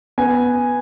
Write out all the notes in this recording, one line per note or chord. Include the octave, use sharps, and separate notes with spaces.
B3 G#5